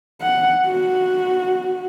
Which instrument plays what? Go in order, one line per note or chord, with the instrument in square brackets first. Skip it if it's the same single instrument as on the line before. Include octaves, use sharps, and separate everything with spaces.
[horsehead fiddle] F#5
F#4